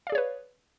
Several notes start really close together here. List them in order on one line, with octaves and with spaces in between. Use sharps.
F5 D5 G#4 C#5 B4